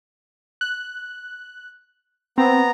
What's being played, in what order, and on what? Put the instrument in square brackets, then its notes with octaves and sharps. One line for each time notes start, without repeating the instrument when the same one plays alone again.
[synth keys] F#6
[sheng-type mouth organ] B3 A#5 [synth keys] C4